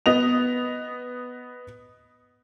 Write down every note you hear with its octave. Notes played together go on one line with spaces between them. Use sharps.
B3 D#5 F7